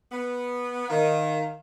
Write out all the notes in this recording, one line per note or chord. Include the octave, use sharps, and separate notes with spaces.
B3
D#3 F5